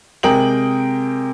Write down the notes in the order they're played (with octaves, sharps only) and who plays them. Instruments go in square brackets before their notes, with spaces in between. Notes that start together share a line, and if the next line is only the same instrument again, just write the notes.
[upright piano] C3 G#3 A#4 G5 D#6 F#7